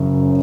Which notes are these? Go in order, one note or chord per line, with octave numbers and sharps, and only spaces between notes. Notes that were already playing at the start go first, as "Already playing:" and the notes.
Already playing: F#1 F#2 C#3